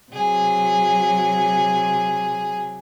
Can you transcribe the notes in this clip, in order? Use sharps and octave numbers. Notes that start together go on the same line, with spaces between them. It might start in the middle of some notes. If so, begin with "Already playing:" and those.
C3 F#3 G#4